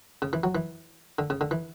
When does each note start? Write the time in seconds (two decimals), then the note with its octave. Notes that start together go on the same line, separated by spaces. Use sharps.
0.22 C#3
0.33 E3
0.43 F#3
0.55 E3
1.19 D3
1.30 C#3
1.41 D3
1.51 E3